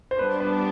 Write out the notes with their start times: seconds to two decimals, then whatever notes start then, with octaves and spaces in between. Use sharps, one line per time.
0.11 C5
0.18 G3 B3 D4 B4
0.40 B4